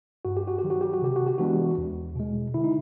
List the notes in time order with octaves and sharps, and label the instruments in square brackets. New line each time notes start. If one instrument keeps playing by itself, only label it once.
[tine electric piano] G2 F#4
G4
F#4
D#3 F#3 G4
F#4
G4
F#4
C3 G4
F#4
G4
E3 G#3 B3 D4 F#4
E2
B2 G#3
D3 E4
D#4